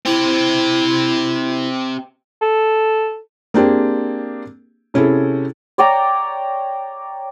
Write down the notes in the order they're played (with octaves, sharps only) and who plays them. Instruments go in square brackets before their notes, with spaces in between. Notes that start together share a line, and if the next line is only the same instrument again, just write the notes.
[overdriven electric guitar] C4 G4 [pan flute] E4
[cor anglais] A4
[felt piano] A#3 C4 D4 G4 G#4
C3 C#4 E4 G#4 A4
[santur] C#5 D5 G5 A#5